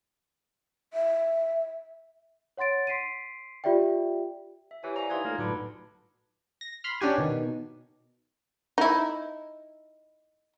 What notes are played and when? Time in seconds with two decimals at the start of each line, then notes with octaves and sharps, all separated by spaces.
0.93 E5
2.57 C#5 F#5 C6 A6 D7
2.87 C6 B6 C7 D7 D#7
3.64 F4 G4 D5 E5 G5
4.71 E5
4.84 E3 G4 C#5 G#5
4.96 C5 D5 F5 G#5 A#5
5.10 E3 D#4 G4 C#5 F5 C6 D#6 G#6
5.25 A3 A#3 D#4 F4 F#4
5.38 A2 D3 F#3 B4 A5 B5
6.61 A#6
6.84 B5 C6 F6
7.01 C#4 D4 F#4 G4 G#5
7.18 B2 D#3
8.78 D#4 E4